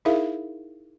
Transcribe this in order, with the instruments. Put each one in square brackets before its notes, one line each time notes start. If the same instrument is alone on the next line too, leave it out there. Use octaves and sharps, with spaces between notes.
[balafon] D#4 E4 G#4 A#4 E5 F5